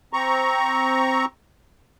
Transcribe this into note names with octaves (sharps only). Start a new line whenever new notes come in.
C4 A#5 C#6